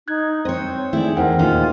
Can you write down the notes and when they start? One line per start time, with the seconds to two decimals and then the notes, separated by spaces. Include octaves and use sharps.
0.08 D#4 F#6 G#6
0.45 C4 C5 C#5 D#5
0.93 D#3 A3 E4 G#4 D5
1.17 E2 A#4 C5 F#5 G5
1.39 D#2 A#2 A#3 C#4 D#4 F4